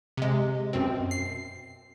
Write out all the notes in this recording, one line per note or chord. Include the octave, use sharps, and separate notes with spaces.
C3 G#3
F#2 B2 C4
C7